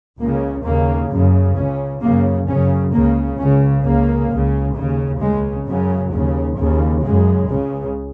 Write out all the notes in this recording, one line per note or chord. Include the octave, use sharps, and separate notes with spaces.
C#2 C#3 A#3
D#2 C#3 A#3
F#2 C#3
C#2 C#3 C#4
F#2 C#3 A#3
F#2 C#3 C#4
C#2 C#3 A#3
C#2 C#3 C#4
C#2 C#3 A#3
C#2 C#3
D#2 C#3
C#2 C#3 G#3
F#2 C#3 F#3
D#2 C#3
D#2 C#3
F#2 C#3 G#3
C#2 C#3